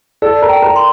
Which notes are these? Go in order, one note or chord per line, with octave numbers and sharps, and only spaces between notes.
A4 D5
A#4
G5
A#4
C6